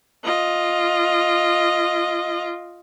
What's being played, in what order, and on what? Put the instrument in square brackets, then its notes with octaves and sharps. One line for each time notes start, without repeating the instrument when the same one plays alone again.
[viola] F4 D#5